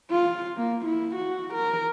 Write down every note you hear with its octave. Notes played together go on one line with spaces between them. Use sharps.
F4
A#3
E4
F#4
A#4